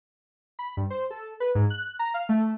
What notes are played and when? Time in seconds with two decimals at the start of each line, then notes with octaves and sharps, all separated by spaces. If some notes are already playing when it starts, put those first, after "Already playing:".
0.59 B5
0.77 G2
0.90 C5
1.10 A4
1.40 B4
1.55 G#2
1.70 F#6
1.99 A#5
2.14 F5
2.29 A3